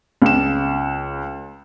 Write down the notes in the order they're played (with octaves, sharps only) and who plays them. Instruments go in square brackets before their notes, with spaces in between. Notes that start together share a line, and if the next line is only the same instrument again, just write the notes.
[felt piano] C#2 E7